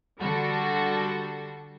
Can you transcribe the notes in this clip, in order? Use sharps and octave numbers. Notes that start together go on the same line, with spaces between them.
D3 G3 F#4 A4